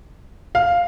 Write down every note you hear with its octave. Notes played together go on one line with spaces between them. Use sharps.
F5